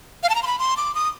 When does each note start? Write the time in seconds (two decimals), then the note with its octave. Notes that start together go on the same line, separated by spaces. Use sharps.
0.23 F5
0.30 A5
0.35 A#5
0.43 C6
0.47 B5
0.59 C6
0.77 D6
0.95 D#6